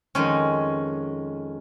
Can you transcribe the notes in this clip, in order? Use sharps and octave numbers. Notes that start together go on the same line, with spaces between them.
F2 D#3 G#3 C#4